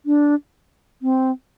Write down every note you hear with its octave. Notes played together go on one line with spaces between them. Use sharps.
D4
C4